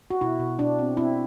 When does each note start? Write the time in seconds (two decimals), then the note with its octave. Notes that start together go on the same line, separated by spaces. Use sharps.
0.10 F#4
0.21 B2 E4
0.40 B2
0.59 B2 D4
0.79 C4
0.97 C4 E4